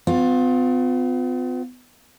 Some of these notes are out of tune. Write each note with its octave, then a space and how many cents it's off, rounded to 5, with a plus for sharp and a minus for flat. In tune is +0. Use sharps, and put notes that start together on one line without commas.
B3 +45 F4 +20